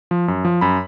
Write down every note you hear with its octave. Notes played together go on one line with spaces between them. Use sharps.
F3
F#2
F3
F#2 B5